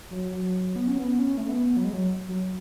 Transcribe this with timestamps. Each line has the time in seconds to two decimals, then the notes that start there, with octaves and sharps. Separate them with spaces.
0.10 F#3
0.31 F#3
0.76 B3
0.88 C#4
0.99 B3
1.19 C#4
1.38 A3
1.49 B3
1.77 F#3
1.84 G#3
1.93 F#3
2.28 F#3